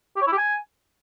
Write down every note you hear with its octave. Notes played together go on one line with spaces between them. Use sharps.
G4
C#5
E4
G4
G#5